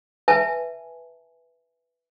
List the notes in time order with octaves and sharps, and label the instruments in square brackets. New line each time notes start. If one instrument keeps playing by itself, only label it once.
[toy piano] B4 E5 G#5 A5